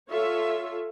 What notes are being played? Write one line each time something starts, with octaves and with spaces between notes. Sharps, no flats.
F4 A4 C#5 E5